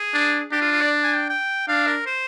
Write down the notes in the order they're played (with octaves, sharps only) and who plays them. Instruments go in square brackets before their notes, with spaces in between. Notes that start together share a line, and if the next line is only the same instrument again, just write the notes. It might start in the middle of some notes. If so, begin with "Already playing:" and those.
Already playing: [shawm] G#4
[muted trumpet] D4
[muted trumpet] D4 [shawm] G4
[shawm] F4
F4
D5
G#5
G5
G5
[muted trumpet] D4 [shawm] F5
[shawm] A#4
C5